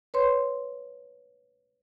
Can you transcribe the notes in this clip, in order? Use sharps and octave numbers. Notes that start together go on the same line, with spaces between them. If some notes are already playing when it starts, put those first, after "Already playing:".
B4 C#5 C6